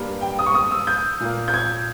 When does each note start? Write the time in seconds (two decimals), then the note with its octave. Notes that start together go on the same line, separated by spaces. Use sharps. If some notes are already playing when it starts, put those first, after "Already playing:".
Already playing: G2 G3 A#3
0.21 G5
0.39 D#6
0.46 C#6
0.55 D#6
0.71 E6
0.87 G6
1.20 A#2 A#3
1.48 G6
1.54 G#6